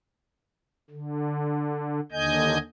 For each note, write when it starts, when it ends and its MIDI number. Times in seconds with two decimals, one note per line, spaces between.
0.91 2.00 50
2.12 2.58 39
2.12 2.58 50
2.12 2.58 75
2.12 2.58 80
2.12 2.58 91